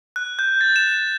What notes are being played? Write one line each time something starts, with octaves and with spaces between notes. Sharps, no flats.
F#6
G6
A6
E7